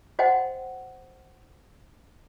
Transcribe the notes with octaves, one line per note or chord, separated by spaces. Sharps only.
F#4 C5 D#5 F#5 G5